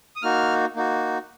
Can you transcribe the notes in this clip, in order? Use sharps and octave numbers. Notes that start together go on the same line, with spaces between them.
D#6
A#3 D#4 F#4 F6
A#3 D#4 F#4